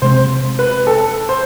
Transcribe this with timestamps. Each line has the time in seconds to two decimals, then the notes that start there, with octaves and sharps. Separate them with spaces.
0.02 C3 G#3 C4 C5
0.59 B4
0.87 A4
1.29 C5